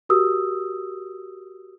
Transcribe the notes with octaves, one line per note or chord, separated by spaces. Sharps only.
F#4 G4 A#4 D#6 E6